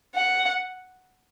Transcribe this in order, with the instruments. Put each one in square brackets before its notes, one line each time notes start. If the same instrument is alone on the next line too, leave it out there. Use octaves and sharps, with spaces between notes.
[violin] F#5